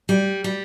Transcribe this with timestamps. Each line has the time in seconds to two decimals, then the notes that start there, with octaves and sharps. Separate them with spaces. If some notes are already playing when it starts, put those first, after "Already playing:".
0.09 G3
0.44 G3